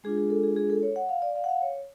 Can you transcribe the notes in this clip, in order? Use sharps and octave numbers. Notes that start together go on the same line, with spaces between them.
G#3 D4 F4 G#4
G#4
A4
G#4
G#4
A4
C#5
F#5
F5
D5
F5
F#5
F5
C#5